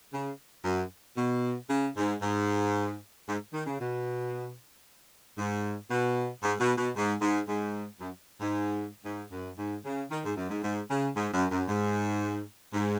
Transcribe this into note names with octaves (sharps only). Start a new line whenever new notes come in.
C#3
F#2
B2
C#3
G#2
G#2
G#2
D#3
C#3
B2
G#2
B2
G#2
B2
B2
G#2
G#2
G#2
F#2
G#2
G#2
F#2
G#2
C#3
D#3
G#2
F#2
G#2
G#2
C#3
G#2
F#2
F#2
G#2
G#2